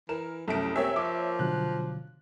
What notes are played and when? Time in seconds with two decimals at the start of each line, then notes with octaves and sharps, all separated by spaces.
0.09 E3 A#4 E7
0.48 C2 F#2 A3 D7
0.76 C3 A#3 C#5 E5 G#5
0.96 F3 D6
1.39 B2 D3 F#3 F#6